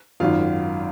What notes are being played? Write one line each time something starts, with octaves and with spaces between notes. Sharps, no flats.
G#1 F#2 D#3 F4 F5